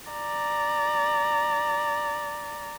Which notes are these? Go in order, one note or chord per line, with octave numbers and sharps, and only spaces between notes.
D5 A#5